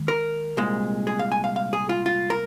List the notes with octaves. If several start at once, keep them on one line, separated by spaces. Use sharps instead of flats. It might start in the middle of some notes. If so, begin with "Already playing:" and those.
Already playing: D#2 D#3 G#3
A#4
C2 A#2 G#3
G#4
F5
G#5
F5
F5
G#4
F4
F4
A#4